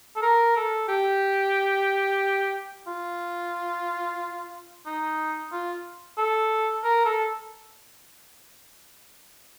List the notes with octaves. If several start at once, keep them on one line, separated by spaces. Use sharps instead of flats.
A4
A#4
A4
G4
F4
D#4
F4
A4
A#4
A4